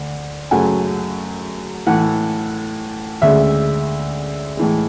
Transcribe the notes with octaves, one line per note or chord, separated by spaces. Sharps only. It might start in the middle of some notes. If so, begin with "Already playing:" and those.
Already playing: D2
F#2 C#3 F#3 A3 G#5
A2 E3 A3 F#5
D2 C#3 G#3 E5
A2 E3 G#3